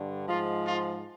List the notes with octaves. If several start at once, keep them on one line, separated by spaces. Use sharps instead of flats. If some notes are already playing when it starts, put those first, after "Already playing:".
Already playing: G2 D3
G#2 F3 G#3 F4
F4